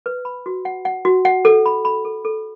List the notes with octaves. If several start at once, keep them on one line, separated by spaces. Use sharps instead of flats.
B4
B5
F#4
F#5
F#5
F#4
F#5
A4
B5
B5
A4
A4